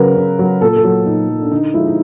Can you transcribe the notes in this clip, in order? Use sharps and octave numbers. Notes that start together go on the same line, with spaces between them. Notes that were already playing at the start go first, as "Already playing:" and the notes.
Already playing: C#3 F#3 A#4 B4
C#3
F#3
A#2 A4
A4
F#3
A#2 D#4
F#3
D4
D3 D#4
F3 G#3 E4
D#4